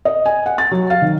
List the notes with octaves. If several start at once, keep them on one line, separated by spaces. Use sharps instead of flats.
D#5
G#5
F#5
A6
F#3
F5
D#3